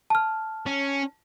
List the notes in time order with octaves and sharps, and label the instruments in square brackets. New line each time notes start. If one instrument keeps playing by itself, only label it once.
[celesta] A5 F6
[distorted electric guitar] C#4